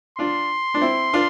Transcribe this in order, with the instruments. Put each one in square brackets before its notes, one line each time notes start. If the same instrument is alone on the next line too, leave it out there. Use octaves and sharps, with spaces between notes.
[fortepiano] D4 F4 [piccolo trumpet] C6
[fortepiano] D4
C4 E4
D4 F4